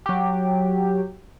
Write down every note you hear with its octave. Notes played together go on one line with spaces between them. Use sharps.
F#3 G4